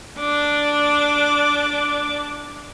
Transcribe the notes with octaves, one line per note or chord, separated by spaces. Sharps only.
D4 D6